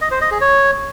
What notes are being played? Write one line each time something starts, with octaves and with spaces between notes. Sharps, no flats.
D#5
C5
D#5
G#4
C#5